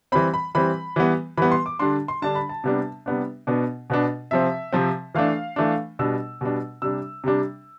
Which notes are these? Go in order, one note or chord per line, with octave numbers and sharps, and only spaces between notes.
E3 G3 C4 B5
B5
E3 G3 C4 B5
E3 G3 B3
E3 G3 B3 B5
C6
D6
D3 G3 D4 C6
C6
D3 G3 D4 A5
B5
A5
C3 G3 B3 D4
C3 G3 B3 D4
B2 B3 D4
B2 B3 D4
C3 F3 C4 E5
C3 F3 C4
E3 A3 D4 F5
E3 A3 D4
B2 G3 D4 E6
B2 G3 D4
C3 G3 D4 E6
C3 G3 D4